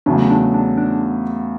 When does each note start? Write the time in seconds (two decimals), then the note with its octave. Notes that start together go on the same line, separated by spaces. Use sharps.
0.06 E2 C#3 F#3 A3 D4
0.30 D4
0.54 D4
0.78 D4